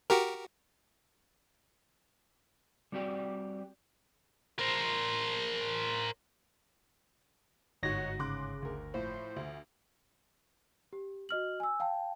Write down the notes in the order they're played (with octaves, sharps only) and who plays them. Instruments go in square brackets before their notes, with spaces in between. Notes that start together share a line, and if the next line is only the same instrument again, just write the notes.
[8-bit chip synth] F#4 G4 A#4
[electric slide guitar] G3 C4 F#4 G4 C#5 D5
[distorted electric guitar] A#4 C5
[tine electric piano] G1 A#6 [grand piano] G#2 [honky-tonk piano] D#4 F#4 [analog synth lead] C#5
[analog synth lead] C#3 [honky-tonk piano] C6 D6 F#6
[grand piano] D2 A#4
[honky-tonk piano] A2 [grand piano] F3 [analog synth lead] C5
[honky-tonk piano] D2
[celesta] G4
F#4 D#5 F6 F#7
G#5 E6
F5 G5 A5